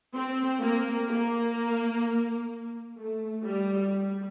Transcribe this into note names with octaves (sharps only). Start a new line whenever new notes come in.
C4
A#3
A#3
A3
G3
G3